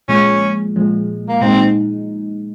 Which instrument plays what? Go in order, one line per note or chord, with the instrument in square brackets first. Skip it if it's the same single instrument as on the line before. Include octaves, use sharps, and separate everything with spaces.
[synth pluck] A#2 F3 G#3 [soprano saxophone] C#4
[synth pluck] A#2 F3 G#3
[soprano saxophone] A#3
[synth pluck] A#2 G#3 D#4 [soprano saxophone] C4